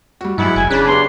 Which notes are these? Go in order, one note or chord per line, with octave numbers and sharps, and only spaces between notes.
G3 F#4
B1 G2 F#3 G#3 B3 E4
F1 G#5
C#3 D4 B4
B3 C#4 G4 C6